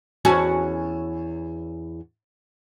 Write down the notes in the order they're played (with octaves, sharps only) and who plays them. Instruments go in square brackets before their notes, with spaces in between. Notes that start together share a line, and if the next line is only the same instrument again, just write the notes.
[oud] E2 C#4 F#4